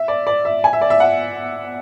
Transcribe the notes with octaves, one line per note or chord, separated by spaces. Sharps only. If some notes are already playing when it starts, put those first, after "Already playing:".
Already playing: E5
D5
D5
E5
G#5
E5
D5
E5
F#5